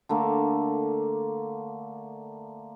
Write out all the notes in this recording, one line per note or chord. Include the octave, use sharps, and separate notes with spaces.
D3 A3 A#3